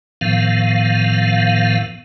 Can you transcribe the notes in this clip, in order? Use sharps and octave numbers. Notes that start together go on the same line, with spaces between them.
A2 D#3 F3 B3 F5